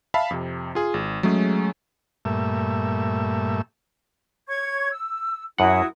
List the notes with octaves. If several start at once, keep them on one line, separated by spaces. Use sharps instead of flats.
E5 F5 A5 B5
F2 C3
F4 G#4
G#1
F#3 G#3 A3 C#4 G#4
G2 A#2 A3 E5
C#5 C#6 G#6
E6
F#2 E4 F#4 F#5 D#6